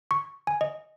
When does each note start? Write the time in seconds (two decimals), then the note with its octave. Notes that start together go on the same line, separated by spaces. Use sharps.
0.11 C#6
0.47 G#5
0.61 D#5